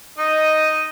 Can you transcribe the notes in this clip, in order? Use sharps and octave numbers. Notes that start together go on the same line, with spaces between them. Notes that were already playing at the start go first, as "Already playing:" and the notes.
D#4 D#5